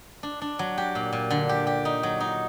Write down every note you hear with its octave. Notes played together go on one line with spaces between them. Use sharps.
D4
D4
F#3
G4
A#2
A#2
D3
G4
G4
D#4
F#3
D#4